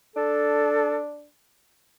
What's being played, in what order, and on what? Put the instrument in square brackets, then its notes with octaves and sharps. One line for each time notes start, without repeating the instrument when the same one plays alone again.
[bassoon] D4 [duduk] A4